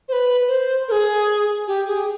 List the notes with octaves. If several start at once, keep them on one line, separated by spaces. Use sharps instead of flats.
C5
B4
C5
A#4
G#4
G4
G#4